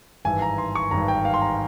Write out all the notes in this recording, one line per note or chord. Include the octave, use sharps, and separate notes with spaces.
G#1 G2 E3 G#5
A#5
C6
C#6
G#1 G2 E3 A#5
G5
F5
C6
A#5